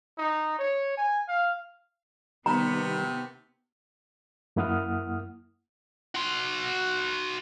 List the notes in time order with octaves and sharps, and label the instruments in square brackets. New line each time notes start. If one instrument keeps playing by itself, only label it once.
[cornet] D#4
C#5
G#5
F5
[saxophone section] D#2 C3 [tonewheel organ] D#3 G3 [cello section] B3 [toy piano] A#5
[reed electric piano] F#2 A#3 E4 F#5 D#6 F6
[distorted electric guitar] F#4 C6